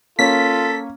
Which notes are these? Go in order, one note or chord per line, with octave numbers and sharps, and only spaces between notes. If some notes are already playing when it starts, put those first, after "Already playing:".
A#3 C#4 F4 A4 B6